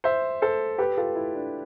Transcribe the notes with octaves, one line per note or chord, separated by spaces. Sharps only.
C5 E5
A4 C5
G4 B4
F4 A4
E4
D4